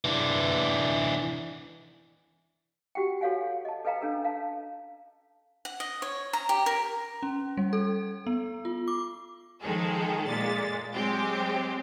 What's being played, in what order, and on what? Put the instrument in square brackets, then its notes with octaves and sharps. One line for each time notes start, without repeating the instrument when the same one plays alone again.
[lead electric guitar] E3 D4
[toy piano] F#4 G4 F#5 G5
F#4 A4 C#5 F5 F#5 G#5
D#5 A5
A4 B4 D#5 F5 G5 A#5
C#4 D4 A4 A#4
F5 A5
[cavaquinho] F#5
D#5
C#5
A#5
G4
A#4
[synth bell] C#4
G3
A4
B3
F4
D6
[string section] D#3 F3 G#3 G#4 A4
A#2 G#3 A6
F#3 G#3 C4 G4